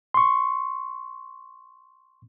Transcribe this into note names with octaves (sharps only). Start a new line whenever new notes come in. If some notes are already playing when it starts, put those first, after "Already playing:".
C6 C#6